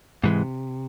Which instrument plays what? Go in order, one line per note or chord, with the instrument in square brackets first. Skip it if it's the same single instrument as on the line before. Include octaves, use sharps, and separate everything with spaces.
[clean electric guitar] G#2 E3 G#3 [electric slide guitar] C3